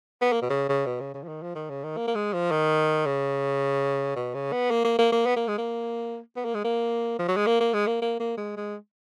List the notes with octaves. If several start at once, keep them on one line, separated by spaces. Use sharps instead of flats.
B3
A#3
B2
C#3
C#3
B2
C#3
C#3
F3
D#3
F3
D#3
C#3
D#3
A#3
A#3
G#3
F3
D#3
C#3
B2
C#3
B3
A#3
A#3
A#3
A#3
B3
A#3
G#3
A#3
B3
A#3
G#3
A#3
F3
F#3
G#3
A#3
A#3
G#3
A#3
A#3
A#3
G#3
G#3